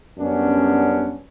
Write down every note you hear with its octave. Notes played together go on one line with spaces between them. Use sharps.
F#2 G3 B3 C#4 D4